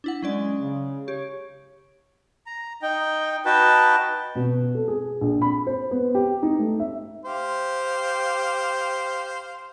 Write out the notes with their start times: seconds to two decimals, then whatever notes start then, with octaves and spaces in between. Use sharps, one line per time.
0.04 D4 E4 F#5
0.23 F#3 G#3 C#4 D5
0.61 C#3
1.08 G4 C#5
2.46 A#5
2.82 D#4 G5
3.45 D#4 F#4 B4 G5 A5
4.35 B2
4.75 A4
4.88 G#4
5.21 A#1
5.42 B5
5.67 C5
5.91 B3
6.15 G4
6.43 D#4
6.59 A3
6.80 E5
7.25 G4 C5 F5